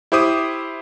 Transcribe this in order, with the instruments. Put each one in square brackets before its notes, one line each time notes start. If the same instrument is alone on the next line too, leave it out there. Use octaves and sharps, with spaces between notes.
[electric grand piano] E4 G4 C5 D6 D#6